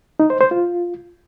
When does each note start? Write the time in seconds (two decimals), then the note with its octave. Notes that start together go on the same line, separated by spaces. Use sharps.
0.20 D#4
0.30 C5
0.41 C5
0.51 F4